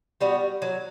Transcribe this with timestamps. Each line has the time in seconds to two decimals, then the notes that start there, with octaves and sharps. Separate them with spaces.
0.21 G3 B3 F#4
0.62 F#3